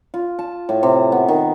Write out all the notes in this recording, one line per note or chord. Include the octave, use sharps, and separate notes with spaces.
F4
A5
A2
C3
B3
D#3